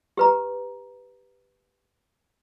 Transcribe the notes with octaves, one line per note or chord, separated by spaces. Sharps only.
G4 B4 A#5